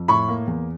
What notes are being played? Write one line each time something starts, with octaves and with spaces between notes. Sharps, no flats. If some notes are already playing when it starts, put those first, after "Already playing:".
Already playing: F2
A2 B5 C#6
A#3
E2